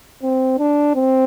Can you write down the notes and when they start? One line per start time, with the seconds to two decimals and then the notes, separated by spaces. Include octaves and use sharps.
0.23 C4
0.59 D4
0.95 C4